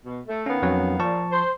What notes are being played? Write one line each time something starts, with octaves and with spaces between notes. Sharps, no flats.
B2
A3
D#3 B3 C#4 F5
F2 F#3 C#4
A#2 F3 A5 C#6
C5